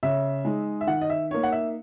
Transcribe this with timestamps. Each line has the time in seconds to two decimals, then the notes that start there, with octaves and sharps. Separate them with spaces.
0.03 C#3 E5
0.45 G#3 D#4
0.81 E5
0.87 D#3 F#5
1.01 D#5
1.10 E5
1.31 A#3 D#4 C#5
1.43 F#5
1.52 E5